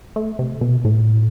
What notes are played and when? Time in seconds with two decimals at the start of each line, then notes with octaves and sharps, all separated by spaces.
0.16 A3
0.39 C3
0.61 B2
0.85 A2